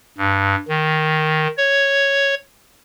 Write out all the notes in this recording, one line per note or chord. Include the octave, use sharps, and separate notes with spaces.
G2
D#3
C#5